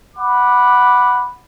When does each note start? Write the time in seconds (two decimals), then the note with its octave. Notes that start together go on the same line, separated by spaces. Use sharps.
0.16 F#5 B5 D6